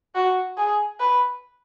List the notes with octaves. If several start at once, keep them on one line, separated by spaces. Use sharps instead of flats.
F#4
G#4
B4